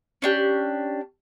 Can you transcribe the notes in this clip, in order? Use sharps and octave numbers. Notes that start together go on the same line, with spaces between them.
C#4 D4 G4